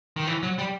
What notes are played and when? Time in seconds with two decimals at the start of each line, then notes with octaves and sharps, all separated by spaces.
0.17 D#3
0.27 E3
0.43 F#3
0.58 G3